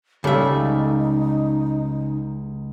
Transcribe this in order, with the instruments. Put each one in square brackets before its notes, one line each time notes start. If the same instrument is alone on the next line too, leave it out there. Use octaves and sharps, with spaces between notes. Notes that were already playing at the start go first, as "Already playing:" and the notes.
[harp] C#2 [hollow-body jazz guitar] C#3 E5 [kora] G3 G4 A4 [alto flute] D#4